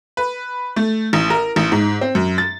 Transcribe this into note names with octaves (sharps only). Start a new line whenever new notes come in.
B4
A3
A1
A#4
A1
G#2
C4
F#2
A6